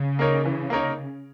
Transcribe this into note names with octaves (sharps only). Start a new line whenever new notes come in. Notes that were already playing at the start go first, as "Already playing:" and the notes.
Already playing: C#3
A#3 D#4 A#4 C#5
E3
A#3 D#4 A#4 C#5